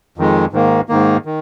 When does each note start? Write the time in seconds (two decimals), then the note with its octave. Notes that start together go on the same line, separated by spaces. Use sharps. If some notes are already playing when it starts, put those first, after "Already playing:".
0.18 F2 D#3 G#3
0.53 G#2 D#3 A#3
0.89 G#2 D#3 A#3
1.25 D#3